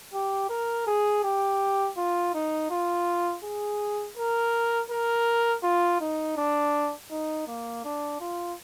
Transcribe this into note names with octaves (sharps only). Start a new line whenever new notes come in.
G4
A#4
G#4
G4
F4
D#4
F4
G#4
A#4
A#4
F4
D#4
D4
D#4
A#3
D4
F4